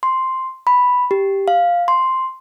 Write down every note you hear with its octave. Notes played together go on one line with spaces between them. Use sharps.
C6
B5
G4
F5
C6